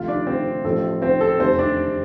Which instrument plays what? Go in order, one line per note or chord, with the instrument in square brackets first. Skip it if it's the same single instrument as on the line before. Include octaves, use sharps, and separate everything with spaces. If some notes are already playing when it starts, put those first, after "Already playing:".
Already playing: [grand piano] D2 C3 F3 F4 F5
D4 D5
C4 C5
A1 A2 F3 A3 C4 A4
C4 C5
A4
F1 E2 C3 C4 C5
D4 D5